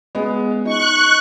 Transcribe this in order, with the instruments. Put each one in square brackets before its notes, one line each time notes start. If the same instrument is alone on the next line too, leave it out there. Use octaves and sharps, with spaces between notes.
[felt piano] G#3 B3
[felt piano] D#4 [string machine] C#6 F#6